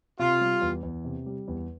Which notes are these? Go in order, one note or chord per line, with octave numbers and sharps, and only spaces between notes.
C3 F4
G3
E2
E2
C3
G3
E2